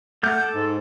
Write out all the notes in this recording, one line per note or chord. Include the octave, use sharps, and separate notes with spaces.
A3 F#5 D6 F6 G6
A4
G#2